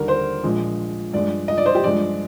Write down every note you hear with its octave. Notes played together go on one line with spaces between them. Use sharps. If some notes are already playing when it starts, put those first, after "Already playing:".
Already playing: D#2 D3 G3 A#4
C5
A#1 A#2 F3 G#3
G2 F3 G#3 D5
D#5
D5
C5
G4
G2 F3 G#3 D5